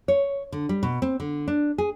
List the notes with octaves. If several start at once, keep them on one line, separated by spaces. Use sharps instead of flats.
C#5
D3
G3
B2
C4
D3
D4
G#4